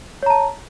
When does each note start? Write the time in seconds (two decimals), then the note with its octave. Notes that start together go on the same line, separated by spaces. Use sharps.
0.23 C#5
0.26 A#5
0.30 A5